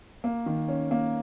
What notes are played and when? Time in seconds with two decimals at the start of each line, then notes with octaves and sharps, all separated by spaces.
0.24 A#3
0.46 D#3
0.68 C#4
0.91 A#3